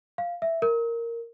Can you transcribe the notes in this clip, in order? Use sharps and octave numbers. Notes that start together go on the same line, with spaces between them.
F5
E5
A#4